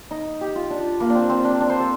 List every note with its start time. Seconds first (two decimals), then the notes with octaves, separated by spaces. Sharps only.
0.11 D#4
0.41 G4
0.56 F4
0.70 D4
1.00 A#3
1.10 D4
1.15 C4
1.30 C4
1.44 D4
1.60 D4
1.70 C5
1.80 A4